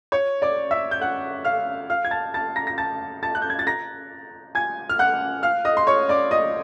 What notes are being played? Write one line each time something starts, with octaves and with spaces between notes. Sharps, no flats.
C#5 C#6
D5 D6
E5 E6
G6
F#5 F#6
F5 F6
F5 F6
G#6
A5 A6
A5 A6
A#5 A#6
A#6
A5 A6
A5 A6
F#6
G6
G#6
A6
A#5 A#6
G#5 G#6
F6
F#5 F#6
F5 F6
D#5 D#6
C6
C#5 C#6
D5 D6
D#5 D#6